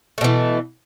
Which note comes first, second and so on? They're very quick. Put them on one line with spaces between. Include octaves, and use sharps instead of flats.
A3 B2 E3